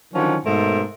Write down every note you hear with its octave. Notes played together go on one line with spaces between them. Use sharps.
D3 D#3 F3 F#3 C#4
G#2 B2 A3 A#4 C5